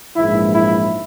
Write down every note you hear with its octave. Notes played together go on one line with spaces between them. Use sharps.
A#1 G#2 E3 E4
E4